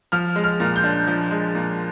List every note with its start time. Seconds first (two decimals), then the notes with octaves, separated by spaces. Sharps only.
0.12 F3 F6
0.36 G#3
0.44 F6
0.60 A#2
0.76 G6
0.84 D4
1.07 F3
1.31 G#3
1.55 A#2